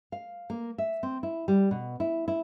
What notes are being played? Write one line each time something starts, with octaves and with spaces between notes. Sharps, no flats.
F5
A#3
E5
C4
E4
G3
B2
E4
E4